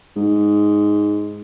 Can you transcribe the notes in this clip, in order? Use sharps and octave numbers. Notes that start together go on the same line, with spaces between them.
G#2